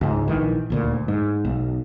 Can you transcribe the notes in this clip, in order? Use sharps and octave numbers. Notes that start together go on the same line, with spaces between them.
C#2 G#2
A#1 D#3 E3
D#1 D2 A#2
G#2
B1